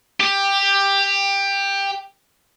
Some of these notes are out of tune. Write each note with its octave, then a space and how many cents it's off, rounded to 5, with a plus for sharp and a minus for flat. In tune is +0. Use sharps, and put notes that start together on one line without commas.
G4 +15